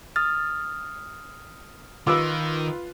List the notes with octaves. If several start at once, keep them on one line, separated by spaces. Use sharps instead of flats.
D#6 F6 A6
D#3 F4 B4 D6 E6